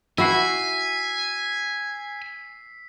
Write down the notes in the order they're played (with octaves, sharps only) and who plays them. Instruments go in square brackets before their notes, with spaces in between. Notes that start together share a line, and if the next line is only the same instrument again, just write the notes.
[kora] E4 F#4 [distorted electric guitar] G#5 [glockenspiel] E6 [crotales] B6 C7